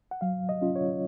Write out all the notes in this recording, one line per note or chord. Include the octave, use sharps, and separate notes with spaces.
F#5
F#3 F5
D#5
C#4 F4
C#5